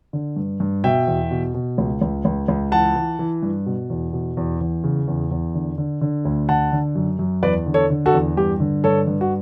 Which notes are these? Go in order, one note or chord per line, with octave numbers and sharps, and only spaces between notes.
D3
G2
G2
B2 E5 G5
E2
B2
B2
C#2
C#2
C#2
C#2
E3 F#5 A5
E3
E3
G2
B2
E2
B2
E2
E2
C#3
E2
E2
D3
D3
D3
D2
D3 F#5 A5
D3
F#2
F#2
E2 B4 D5
D3
A4 C#5
D3
F#4 A4
E2
G2 G4
D3
G2 A4 C#5
G2
F#4